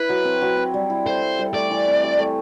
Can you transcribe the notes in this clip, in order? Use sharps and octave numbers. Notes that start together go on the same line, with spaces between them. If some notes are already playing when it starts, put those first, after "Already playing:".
Already playing: E4 B4
F#3
C4
F#3
C4
G3
E4
A4 C5
C4
G3
A3 D5
E3
C4
G4
A3